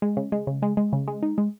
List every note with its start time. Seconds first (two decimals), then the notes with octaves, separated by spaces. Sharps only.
0.02 G#3
0.17 C#3
0.32 G#3
0.47 C#3
0.62 G#3
0.77 G#3
0.93 C#3
1.08 G#3
1.23 D#4
1.38 G#3